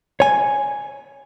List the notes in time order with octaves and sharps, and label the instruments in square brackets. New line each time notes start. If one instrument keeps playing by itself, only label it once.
[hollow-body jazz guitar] C#5 G#5